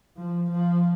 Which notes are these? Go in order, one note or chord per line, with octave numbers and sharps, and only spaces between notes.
F3
F3